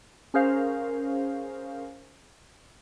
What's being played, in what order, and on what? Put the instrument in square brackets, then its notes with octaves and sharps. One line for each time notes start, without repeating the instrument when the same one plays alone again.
[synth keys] C#4 G#4 A#4 C5 F5